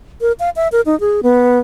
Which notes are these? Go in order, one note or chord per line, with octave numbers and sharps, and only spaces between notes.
A#4
F5
E5
A#4
D#4
G#4
B3